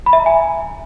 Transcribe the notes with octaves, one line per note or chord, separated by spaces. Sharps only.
B5
E5
A#5
G#5